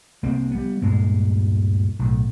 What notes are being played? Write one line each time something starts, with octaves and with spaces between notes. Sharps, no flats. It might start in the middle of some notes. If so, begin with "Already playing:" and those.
C2 A#3 C4
G3 B3
D2 G2 A#2 G#3
B1 A2